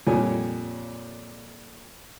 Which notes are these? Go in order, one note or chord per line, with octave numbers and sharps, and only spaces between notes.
F2 A#2 G3 C#5 G#5